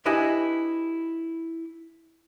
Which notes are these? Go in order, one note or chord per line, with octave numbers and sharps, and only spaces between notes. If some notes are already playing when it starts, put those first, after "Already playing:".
D4 E4 G4 B4 D#5 G#5